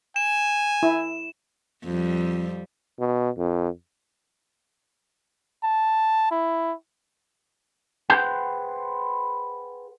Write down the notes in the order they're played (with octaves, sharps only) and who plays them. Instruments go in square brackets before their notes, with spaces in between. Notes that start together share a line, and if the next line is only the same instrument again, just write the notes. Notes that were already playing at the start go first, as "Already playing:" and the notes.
[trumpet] G#5 [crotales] E7
[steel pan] E4
[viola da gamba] F2 G3
[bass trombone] B2
F2
[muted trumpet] A5
E4
[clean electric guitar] G#4 B4 C5 F#5 G5